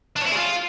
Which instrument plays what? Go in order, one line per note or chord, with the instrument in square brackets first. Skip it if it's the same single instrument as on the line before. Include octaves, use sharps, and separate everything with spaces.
[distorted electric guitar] D4
C#5
E4
G#4
F4